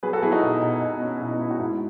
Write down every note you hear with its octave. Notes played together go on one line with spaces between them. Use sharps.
F#3 G#4 B4
F#4 A4
F#3 E4 G#4
D#4 F#4
B2
B2
B2
C#4
B2 E4
D#4
B2 E4
D#4 F#4
G#2 E4